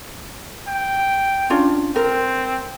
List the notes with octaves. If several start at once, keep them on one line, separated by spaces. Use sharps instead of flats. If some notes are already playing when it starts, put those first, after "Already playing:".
G5
C#4 D4 F4
C4 A#4